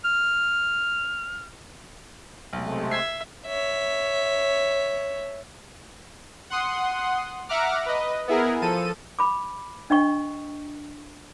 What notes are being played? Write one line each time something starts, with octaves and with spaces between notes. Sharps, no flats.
F6
B1 C3 G#3 A3
E5 G#6 C7
C#5 E5
F#5 C6 D#6
E5 F#5 A#5 D6 F6
B4 D#5
B3 E4 G#4 A#4
F3 A4 D#7
B5 D6
D4 D#5 G5 C#6